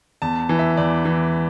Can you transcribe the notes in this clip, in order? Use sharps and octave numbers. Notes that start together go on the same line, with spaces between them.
E2 A5
E3
E5
E2 D5
E3